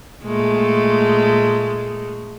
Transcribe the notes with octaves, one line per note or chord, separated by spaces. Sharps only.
A#2 G#3 A3